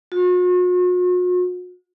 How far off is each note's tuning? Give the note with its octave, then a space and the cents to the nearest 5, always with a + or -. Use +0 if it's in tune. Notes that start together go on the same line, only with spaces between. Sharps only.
F#4 -45